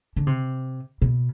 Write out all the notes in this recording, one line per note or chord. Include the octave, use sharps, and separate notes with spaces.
D3
C3
B2